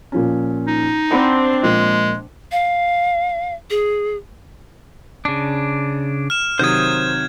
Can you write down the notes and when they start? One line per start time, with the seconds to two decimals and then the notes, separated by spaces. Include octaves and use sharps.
0.12 A#2 F3 C#4
0.67 D#4
1.11 C4 D4 D5 F#5 B5
1.63 A#2 F3 G#3
2.52 F5
3.70 G#4
5.25 C#3 D4
6.30 F6 E7
6.59 C3 D#3 F#3 C5 D#6 G6 G#6